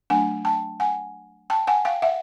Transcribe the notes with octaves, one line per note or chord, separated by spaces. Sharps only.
F#3 A3 D4 F#5 G#5
G5 A5
F#5 G#5
G5 A5
F#5 G#5
F5 G5
E5 F#5